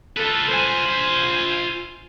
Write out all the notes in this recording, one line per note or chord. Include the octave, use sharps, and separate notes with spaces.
F4 A4 B4
C5 G#5
F4 B5